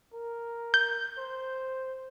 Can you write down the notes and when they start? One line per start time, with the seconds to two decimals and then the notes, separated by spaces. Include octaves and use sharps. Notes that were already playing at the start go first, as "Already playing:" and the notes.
0.14 A#4
0.74 G6
1.18 C5